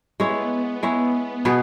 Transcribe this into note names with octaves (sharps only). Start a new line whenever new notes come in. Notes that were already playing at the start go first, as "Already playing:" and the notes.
G#3 B3 E4 C#5
G#3 B3 E4 C#5
B2 B3 G#4 B4